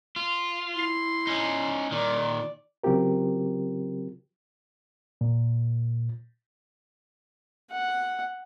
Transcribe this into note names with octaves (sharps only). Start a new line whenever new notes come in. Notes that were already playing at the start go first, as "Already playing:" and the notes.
F4
E4 C6
C#4 D#4
A#2 D#3 D5
C#3 F#3 C4 F4 G4 A#4
A#2
F#5